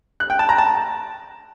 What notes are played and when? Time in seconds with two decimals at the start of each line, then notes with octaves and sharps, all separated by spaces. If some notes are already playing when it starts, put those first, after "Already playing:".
0.20 F#6
0.30 G5
0.39 A5
0.49 A#5
0.58 A5